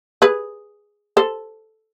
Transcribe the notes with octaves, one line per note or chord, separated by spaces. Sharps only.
G#4 B4
A4 C5